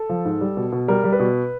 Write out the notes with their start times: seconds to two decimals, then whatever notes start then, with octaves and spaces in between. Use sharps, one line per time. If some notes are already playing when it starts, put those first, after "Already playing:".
Already playing: A4
0.09 F3
0.25 G#2
0.41 G3
0.57 B2
0.72 B2
0.88 G3 A#4
1.04 G3
1.12 B4
1.20 B2